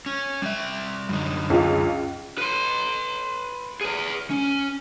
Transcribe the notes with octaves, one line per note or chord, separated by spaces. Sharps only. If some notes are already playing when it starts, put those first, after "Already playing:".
C#4
G3 E5
F#2 D3 D#4
C#2 F4
B4 C6
G#4 B4
C#4